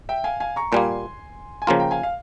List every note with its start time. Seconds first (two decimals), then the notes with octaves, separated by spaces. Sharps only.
0.09 E5 G5
0.24 F5 G#5
0.40 F5 G#5
0.56 A#5 C#6
0.72 A#2 G3 A#3 G#5 C6
1.62 G#5
1.67 C#3 F3 A#3 F4 G5 A#5
1.79 G5 A#5
1.91 F5 G#5
2.03 F5